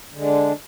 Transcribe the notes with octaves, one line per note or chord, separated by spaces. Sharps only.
D3 G#3 D4